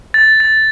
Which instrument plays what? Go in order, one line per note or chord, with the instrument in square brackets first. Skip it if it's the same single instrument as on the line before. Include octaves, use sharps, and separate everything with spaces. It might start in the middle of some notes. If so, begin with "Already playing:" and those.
[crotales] A6
A6